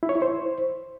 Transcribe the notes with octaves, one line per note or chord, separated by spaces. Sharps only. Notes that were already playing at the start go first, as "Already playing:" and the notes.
E4
C#5
E4
C5